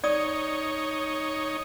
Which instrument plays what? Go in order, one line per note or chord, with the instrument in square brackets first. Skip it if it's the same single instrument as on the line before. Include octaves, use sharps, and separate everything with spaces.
[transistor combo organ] D#4 C#5 [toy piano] D5 D#6